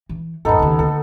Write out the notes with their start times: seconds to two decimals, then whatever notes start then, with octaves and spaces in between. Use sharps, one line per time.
0.09 E3
0.45 F#2 A2 B3 D#4 A4
0.59 D#2 C#3
0.79 D2 A4